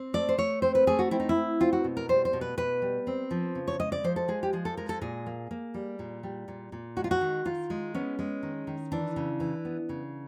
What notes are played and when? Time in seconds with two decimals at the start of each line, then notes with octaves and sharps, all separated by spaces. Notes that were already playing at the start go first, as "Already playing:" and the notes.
Already playing: C4
0.14 A3 D5
0.29 C5
0.38 A3 C#5
0.62 C4 C5
0.75 B4
0.87 A3 G#4
0.99 F#4
1.11 C4 E4
1.20 D#4
1.29 E4
1.36 C4
1.60 C4 F4
1.73 F#4
1.84 B2
1.97 A#4
2.09 G3 C5
2.25 C5
2.33 B2
2.41 B4
2.57 B2 B4
2.82 G3
3.07 C4
3.31 F3
3.55 C#3
3.68 C#5
3.80 G#3 D#5
3.92 D5
4.04 F3 C5
4.16 A4
4.28 G#3 G#4
4.43 G4
4.53 F3 G#4
4.65 A4
4.77 G#3 A#4
4.89 A4
5.01 A#2 G#4
5.26 A#3
5.51 A#3
5.74 G3
5.99 A#2
6.23 G3
6.48 A#2
6.72 A#2
6.96 G#3 F#4
7.04 F4
7.11 F#4
7.21 D#3
7.45 D#3 F4
7.70 G#3
7.95 B3 C#4
8.19 G#3
8.43 D#3
8.67 D#3
8.92 E3 D4
9.16 C#3
9.40 E3
9.65 B3
9.89 C#3